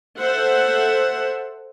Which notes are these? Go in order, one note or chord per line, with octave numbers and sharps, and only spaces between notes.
A4 C5 E5 F#5